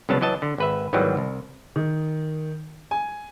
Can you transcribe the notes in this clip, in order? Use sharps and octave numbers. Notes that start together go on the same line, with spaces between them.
C2 C#3 F#3 B3 A5
E3 F#3 D#5 A5
D3
G#1 B4 E5
G#1 D#3 E3 F#3 G3
C2
D#3
G#5